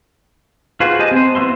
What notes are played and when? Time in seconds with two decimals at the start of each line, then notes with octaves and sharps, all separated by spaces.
0.80 F4 F#4 G#4 B4 C5
0.99 G4 D#5 G#5 A5
1.11 C4 C5
1.35 E3 B3 F#4 E5 C6